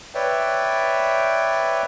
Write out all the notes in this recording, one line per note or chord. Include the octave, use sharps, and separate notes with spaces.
B4 C#5 D5 E5 G5